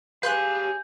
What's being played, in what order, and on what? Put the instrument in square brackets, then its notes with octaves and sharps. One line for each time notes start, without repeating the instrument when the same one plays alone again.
[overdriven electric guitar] G4 F5 [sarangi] G#4 [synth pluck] B4 C6 F#6 [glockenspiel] G6